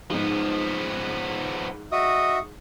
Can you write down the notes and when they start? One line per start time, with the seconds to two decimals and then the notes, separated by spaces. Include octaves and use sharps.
0.10 G#2 F3 B3 D#4
1.92 F#4 D#5 E5 C#6 D#6